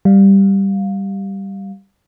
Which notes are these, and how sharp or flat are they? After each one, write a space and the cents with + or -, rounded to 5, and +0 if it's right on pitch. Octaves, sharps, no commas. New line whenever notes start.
G3 +0 F5 +10